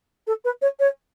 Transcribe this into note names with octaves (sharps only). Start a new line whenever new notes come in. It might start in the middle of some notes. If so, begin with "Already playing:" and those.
A4
B4
C#5
C#5